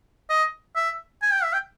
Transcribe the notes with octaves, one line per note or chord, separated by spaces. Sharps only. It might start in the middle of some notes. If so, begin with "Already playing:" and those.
D#5
E5
G#5
G5
E5
G5